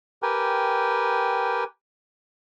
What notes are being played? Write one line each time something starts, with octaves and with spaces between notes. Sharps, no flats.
G4 A#4 B4 G5 G#5